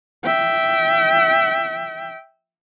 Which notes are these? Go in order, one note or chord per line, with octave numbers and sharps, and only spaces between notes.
E5 G5